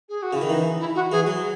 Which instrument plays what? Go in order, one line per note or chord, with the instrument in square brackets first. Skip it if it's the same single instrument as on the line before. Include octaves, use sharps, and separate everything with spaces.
[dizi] G#4
F#4
[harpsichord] C#3 [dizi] E4
[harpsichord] D#3
[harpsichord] E3 [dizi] D#4
[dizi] E4
F#4
[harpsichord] E3 [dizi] G#4
[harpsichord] F#3